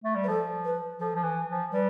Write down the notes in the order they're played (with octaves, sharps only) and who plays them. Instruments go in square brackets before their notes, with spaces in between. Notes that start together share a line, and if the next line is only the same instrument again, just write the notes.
[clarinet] A3
G3
[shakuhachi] B4
[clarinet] F3 [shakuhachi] A4
[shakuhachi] B4
[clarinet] F3 [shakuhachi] A4
[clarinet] F3
E3
F3
[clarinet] G3 [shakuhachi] B4